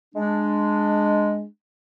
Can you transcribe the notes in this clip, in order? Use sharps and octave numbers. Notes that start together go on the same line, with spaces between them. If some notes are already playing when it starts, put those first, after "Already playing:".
G#3 D4